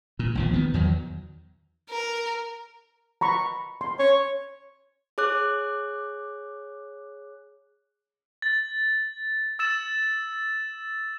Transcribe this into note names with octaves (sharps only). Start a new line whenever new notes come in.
A#2
A#1 D#2 F3
D#3 B3
E2 D#3 F#3
A#4
A#5 B5 C#6
C6
C#5
G#4 C#5 D6 F#6
A6
E6 A6 E7